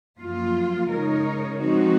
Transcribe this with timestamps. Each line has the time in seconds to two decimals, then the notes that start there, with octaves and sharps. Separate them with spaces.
0.19 F#2 F3 A#3 F4
0.90 C#3 G#3 D#4 A#4 C#5
1.61 F3 G#3 C4 D#4 F#4